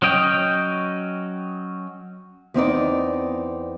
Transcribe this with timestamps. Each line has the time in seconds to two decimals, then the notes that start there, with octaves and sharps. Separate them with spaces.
0.02 F#3 C#4 D#5 G5
2.54 E2 C4 D#4 D5